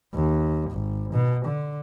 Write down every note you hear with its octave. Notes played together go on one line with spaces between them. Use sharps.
D#2
G#1
B2
D3